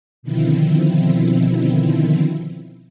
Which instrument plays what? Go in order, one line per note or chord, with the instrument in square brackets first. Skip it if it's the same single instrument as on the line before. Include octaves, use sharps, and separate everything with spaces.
[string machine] B2 D3 D#3 F3 C4 E4